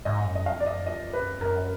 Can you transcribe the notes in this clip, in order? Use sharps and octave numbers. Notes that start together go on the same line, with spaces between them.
G#2 D#5
F#2
D#5
F2 F5
D5
F#2 D#5
F2 D#5
F#2 B4
F#2 A#4